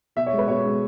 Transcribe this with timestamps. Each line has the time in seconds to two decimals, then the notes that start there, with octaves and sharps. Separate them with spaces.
0.16 B2 E5
0.27 C#5
0.33 G#3
0.38 B4
0.48 B2 C#5
0.65 G#3